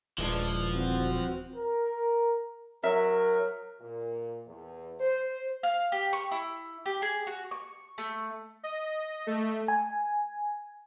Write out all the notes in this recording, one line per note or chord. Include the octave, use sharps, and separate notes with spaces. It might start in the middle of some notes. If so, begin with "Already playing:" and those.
D#1 E3 F3 G#3 D4
C4 F#4
A#4
F#3 A#4 E5
A#2
E2
C5
F5
G4
C#6
E4
G4
G#4
F#4
C#6
A3
D#5
A3
G#5